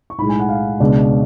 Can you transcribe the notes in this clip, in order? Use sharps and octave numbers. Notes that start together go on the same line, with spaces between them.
C#6
B1 A2 G#3 B5
G#5
F#5
F5
C#2 B2 G#3 D4